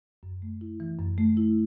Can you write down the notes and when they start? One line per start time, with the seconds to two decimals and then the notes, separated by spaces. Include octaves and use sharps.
0.23 F#2
0.42 A3
0.61 E4
0.80 E3
0.99 F#2
1.18 A3
1.37 E4